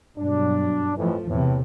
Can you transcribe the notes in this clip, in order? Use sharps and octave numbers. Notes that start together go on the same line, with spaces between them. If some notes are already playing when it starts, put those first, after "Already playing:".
G2 B2 F#3 D4
F2 A2 E3 F3 A3
E2 A2 C3 E3